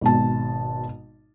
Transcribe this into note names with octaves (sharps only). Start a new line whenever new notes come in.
G#1 B2 A5